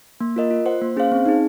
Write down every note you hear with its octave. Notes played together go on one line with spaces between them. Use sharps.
A#3
F4 A#4 D#5
F4
C5 F#5
A#3
C#4 G#4 C5 F5
C4
D#4 G#4